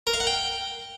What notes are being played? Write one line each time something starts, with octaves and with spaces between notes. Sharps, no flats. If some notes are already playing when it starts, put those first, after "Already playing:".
A#4
F5
F#5
G5